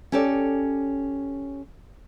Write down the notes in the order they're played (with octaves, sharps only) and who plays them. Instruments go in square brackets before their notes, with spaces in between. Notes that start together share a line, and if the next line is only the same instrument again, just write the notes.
[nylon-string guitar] C#4 G4 A4 C#5 D5